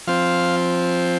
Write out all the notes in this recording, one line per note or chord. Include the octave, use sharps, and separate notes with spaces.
F3 C4 F5